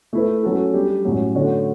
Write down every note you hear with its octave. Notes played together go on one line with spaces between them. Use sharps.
A3 E4 B4
F#3 C#4 F#4 A4
G3 D4 G4
A2 F#3 C#4
D3 A3 D4 F#4 C#5